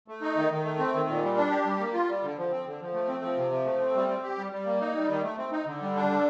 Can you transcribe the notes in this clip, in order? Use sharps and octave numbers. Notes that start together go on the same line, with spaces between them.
A3
D#4
D#3
D#3
A3
C4
D#3
A#2
G3
D4
G4
G3
A#3
F4
G3
D3
F3
C4
D3
F3
A3
C4
F3
C3
F3
A3
C4
G3
C4
G4
G3
G3
A#3
D#4
G3
D#3
A3
C4
D#4
D3
G3
D4
D3